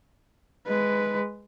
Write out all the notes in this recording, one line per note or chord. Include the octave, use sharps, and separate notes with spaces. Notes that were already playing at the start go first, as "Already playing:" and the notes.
G#3 B4